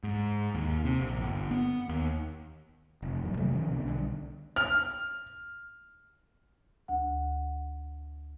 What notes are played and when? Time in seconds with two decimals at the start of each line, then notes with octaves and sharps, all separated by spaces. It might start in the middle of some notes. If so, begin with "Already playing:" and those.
0.04 G#2
0.55 D#2
0.85 C3
1.01 A#1
1.21 G1
1.51 B3
1.89 D#2
3.02 F1
3.23 E2 A#2 F#3
3.37 C3 D#3 F#3 A3
3.52 D#3 F3 C4 C#4
3.70 C2 B2 B3 D4
3.86 B1 D3 E3 G3
4.56 F6
6.88 D2 F#5